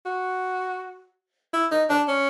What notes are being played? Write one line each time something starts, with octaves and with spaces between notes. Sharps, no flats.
F#4
E4
D#4
D4
C#4